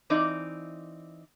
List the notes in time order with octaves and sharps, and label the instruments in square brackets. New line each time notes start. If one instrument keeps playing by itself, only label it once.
[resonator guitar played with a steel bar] E3 C4 D#4 D5